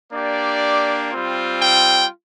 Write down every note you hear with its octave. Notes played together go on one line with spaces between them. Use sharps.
A#3 D4 G4 D5
G3 C4 F4
G5